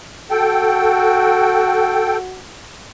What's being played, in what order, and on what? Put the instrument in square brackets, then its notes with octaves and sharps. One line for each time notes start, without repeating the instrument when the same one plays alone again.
[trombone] F#4 [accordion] A4 G5